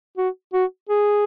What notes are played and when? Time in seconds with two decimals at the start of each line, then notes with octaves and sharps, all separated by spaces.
0.18 F#4
0.54 F#4
0.89 G#4